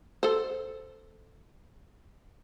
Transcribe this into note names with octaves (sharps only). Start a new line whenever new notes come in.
A4 C5